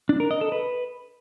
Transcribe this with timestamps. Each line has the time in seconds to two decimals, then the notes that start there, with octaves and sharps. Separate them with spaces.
0.09 D4
0.20 A#4
0.31 D#5
0.41 A4
0.52 B4